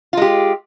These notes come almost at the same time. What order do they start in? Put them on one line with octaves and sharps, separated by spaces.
F4 G#3 G4